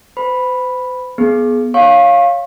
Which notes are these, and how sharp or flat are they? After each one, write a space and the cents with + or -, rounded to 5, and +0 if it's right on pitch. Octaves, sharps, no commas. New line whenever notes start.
C5 -45 B5 +0
B3 -15 G#4 +20
C#5 +0 F5 +0 C#6 -35